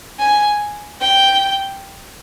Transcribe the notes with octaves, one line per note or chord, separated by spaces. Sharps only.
G#5
G5